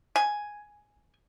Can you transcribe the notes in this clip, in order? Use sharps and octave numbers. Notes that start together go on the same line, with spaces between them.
G#5